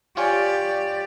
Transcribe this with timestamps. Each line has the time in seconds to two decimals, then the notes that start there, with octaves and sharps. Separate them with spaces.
0.17 F4 G4 C#5 D5 G#5